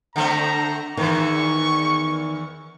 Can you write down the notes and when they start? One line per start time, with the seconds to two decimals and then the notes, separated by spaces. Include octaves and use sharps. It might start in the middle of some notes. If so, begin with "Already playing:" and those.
0.16 D3 A3 C4 A#5
0.97 E2 D#3 E3 C#6